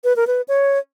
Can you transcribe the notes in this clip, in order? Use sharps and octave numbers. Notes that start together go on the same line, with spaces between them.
B4
A#4
B4
C#5